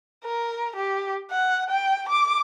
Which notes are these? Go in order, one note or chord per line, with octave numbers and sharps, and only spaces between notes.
A#4
G4
F#5
G5
D6